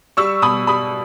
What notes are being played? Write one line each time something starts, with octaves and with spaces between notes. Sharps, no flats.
G3 C#6 E6
B2 B5 D#6
G3 B5 D#6